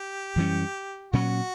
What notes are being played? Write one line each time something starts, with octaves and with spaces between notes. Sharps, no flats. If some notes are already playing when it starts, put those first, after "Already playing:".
Already playing: G4
F#2 E3 G3 C#4
A#2 F#3 C#4 F#4